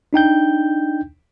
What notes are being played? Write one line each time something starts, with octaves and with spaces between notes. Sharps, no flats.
D4 D#4 G5 G6